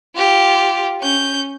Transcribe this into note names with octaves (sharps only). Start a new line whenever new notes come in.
F4 G4
C#4 G6